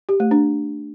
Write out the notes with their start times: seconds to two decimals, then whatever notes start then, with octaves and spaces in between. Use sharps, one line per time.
0.09 G4
0.20 A3
0.31 D4